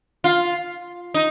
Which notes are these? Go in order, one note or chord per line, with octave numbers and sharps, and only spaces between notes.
F4
D#4